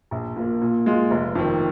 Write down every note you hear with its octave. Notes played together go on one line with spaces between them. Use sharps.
A#1
A#2 A#3
A#2
G#3 F4
F1
F2 D#3